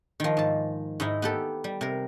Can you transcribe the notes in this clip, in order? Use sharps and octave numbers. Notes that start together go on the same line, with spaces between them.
D#3 F3
G#2 A5
G#2 G#3 D#4 E4
B3 G4 A4
G3
C3 A#4